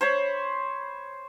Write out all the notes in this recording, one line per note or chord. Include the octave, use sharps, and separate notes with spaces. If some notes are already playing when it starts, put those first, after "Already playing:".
C5 C#5 B5